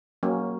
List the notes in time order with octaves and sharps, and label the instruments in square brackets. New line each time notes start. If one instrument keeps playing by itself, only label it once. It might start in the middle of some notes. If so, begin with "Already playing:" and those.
[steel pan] F#3 A#3 C#4